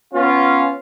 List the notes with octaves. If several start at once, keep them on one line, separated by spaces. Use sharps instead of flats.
B3 C#4 F4